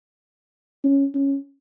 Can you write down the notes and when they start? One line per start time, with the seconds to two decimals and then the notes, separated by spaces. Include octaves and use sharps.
0.84 C#4
1.15 C#4